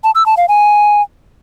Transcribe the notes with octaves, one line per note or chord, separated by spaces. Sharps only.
A5
E6
A5
F5
G#5